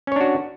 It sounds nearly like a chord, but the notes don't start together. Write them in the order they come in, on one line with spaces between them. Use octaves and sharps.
C#4 C#5 D4 F#4